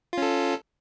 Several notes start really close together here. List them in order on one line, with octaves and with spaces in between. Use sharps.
F4 C#4 A4